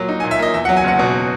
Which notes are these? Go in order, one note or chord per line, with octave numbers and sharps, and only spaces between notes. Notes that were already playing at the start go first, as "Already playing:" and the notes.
Already playing: A#2 F#3 A#3
D#4
G#5
A#2
E5
A#3 D#5
E2 E5
F#5
F#3
G#5
F#1 F#5
B2